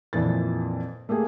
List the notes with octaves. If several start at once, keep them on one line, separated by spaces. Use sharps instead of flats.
F2 A#2 E3 A6
A3 A#3 G4 G#4